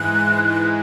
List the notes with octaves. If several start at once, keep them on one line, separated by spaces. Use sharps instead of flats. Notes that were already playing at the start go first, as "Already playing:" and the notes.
Already playing: G#2 E3 G#3 F#6